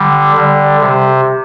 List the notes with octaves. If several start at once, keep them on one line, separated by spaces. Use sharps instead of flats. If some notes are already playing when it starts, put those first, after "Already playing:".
Already playing: D3 G3
D3 G3
C3